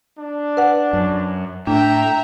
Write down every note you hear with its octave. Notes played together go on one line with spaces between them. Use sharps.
D4
B4 F#5
F#2
A2 D4 E5 G5 A#5